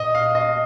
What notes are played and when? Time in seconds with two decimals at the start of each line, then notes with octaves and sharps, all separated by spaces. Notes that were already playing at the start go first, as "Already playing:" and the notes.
Already playing: A#2 D#5
0.15 F5
0.35 D#5